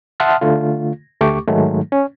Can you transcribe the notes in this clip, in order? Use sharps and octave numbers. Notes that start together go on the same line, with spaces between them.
E5 F#5 A5 C6 D#6 F6
D3 A3 F4
D2 A3 G4 C#6 D6
G#2 D#3 F#3 G#3 A3
C#4